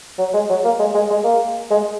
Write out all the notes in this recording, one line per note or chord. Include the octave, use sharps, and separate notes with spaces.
F#3
G#3
F#3
A#3
G#3
G#3
G#3
A#3
G#3